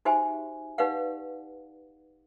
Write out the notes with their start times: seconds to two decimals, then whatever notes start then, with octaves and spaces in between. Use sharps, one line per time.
0.05 D#4 F#4 G4 C5 E5 G#5
0.78 D#4 G4 B4 D5 F5 F#5